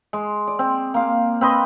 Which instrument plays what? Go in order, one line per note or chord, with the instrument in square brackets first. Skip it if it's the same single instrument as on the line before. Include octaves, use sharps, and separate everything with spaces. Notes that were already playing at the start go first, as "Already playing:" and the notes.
[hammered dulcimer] G#3
D5
C4
A#3 F5
C4 B4 D#5